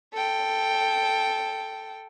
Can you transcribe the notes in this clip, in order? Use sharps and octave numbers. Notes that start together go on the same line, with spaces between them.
A4 G5